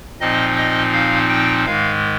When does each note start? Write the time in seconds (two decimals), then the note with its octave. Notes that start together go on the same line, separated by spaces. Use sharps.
0.20 A#2 F3 C4 D#4 D#5
0.57 D#5
0.93 F5
1.29 G5
1.66 G#2 D#3 G#3 F5